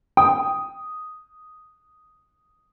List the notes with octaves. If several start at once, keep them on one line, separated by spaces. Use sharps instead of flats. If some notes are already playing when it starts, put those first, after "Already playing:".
G5 D#6